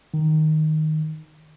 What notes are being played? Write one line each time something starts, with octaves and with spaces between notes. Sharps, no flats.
D#3